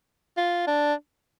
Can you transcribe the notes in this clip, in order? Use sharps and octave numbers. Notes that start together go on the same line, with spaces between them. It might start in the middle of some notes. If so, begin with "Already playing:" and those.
F4
D4